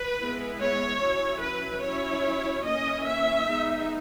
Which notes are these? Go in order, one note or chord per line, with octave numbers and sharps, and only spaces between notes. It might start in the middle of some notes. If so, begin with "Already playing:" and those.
Already playing: B4
G#3 B3 E4
C#5
F#3 C#4 E4
B4
F#3 C#4 E4 C#5
E3 A#3 C#4 D#5
E5
G#3 B3 D#4